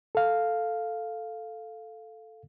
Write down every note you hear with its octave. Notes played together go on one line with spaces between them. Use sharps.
A4 F5